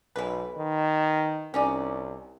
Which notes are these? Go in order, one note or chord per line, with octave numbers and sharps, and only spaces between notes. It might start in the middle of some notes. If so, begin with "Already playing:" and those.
B1 E3 B4
D#3
C2 C#4 D#4 D5